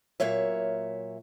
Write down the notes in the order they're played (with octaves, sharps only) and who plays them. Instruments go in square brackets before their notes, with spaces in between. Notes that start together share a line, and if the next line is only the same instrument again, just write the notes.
[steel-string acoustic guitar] A#2 F#3 A#3 C#5 E5